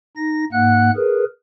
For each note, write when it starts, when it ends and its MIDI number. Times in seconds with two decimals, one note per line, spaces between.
0.17 0.45 63
0.17 0.45 94
0.52 0.91 44
0.52 0.91 58
0.52 0.91 78
0.52 0.91 90
0.96 1.24 68
0.96 1.24 70
0.96 1.24 71